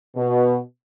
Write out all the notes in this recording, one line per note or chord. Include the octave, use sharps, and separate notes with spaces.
B2